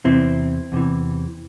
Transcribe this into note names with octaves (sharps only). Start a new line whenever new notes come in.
E2 C3 E3 C4 E4
E2 C3 E3